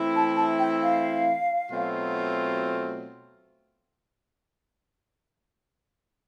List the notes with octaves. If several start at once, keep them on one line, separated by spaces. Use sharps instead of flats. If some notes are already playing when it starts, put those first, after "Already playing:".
Already playing: E3 A3 C4 E4
A5
A5
G5
F5
B2 F#3 A3 C4 F4